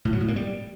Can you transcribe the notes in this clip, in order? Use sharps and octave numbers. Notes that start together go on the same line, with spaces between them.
A2
F#3
A2
A#3
G3